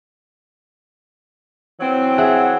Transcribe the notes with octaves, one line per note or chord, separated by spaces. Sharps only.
E3 F#3 C4
G#4 E5 F#5